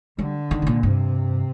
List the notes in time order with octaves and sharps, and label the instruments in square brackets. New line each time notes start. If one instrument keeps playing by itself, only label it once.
[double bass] D3 [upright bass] G3
[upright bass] D#3
C3
A#2
[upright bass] G2 [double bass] C3